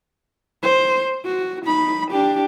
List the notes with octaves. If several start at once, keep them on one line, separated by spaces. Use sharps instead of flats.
C5
F#4
D#4 B5
D4 G4